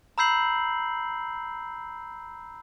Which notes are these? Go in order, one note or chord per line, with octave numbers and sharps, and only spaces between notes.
A#5 B5 E6 G6 C7 F#7